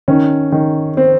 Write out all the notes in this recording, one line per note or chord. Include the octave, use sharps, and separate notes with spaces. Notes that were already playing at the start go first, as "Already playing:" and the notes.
D#3 C#4
D#3
C4